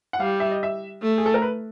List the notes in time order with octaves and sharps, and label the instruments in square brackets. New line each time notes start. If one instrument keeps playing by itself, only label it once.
[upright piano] F#5
[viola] G3 [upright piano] F5
[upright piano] E5
D#5
E5
[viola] A3
[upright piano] G#4
A4
A#4
B4